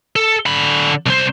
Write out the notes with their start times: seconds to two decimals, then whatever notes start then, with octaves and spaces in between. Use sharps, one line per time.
0.16 A4
0.46 D3 B5
1.06 C2 C5